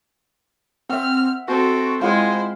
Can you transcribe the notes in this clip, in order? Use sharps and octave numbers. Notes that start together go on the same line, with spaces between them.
C4 E5 F#5 F6
C4 F#4 A4
G#3 E4 F4 C5 F#5 G5